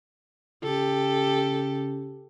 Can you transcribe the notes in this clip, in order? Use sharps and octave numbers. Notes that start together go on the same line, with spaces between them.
C#3 G4 A4